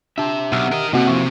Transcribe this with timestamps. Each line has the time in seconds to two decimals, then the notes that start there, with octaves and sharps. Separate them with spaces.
0.18 D4 G4 E5 A5
0.52 B1 F#5 E6 F6
0.72 A#4 D#5
0.93 C3 A#3 C4 F#4 D#5 F#5
1.08 F3 E4 C#6